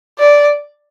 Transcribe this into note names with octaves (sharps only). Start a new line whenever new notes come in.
D5